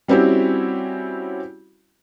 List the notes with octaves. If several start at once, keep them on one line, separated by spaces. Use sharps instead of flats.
G3 C4 C#4 E4 F#4 G4